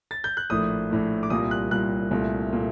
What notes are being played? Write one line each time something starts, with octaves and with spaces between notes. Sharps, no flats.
A6
G6
F#6
A#1 A2 A3 D#6
A#1 A2 A3
D6
C2 A#2 G3 D#6
F#6
C2 A#2 G3 F#6
C2 A#2 A3
A#2 A3